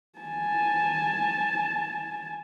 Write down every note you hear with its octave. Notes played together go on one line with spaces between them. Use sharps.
G#5 A5